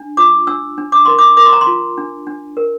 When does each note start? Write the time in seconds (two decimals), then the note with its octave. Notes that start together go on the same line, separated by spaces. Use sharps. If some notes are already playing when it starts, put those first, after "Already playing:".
Already playing: D4
0.17 F4 D6
0.47 D4 E6
0.78 D4
0.92 D6
1.05 A#4 C6
1.18 D6
1.37 A#4 D6
1.46 C6
1.53 A#5
1.61 C6
1.67 F4
1.98 D4
2.27 D4
2.57 A#4